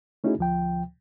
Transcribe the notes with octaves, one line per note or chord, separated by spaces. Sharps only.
A3 C#4 D#4 E4 F#4 G#4
D2 F3 G5